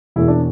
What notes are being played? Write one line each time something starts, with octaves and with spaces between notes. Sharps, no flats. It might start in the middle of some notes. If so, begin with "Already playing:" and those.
E1 E2 B2 E4
D4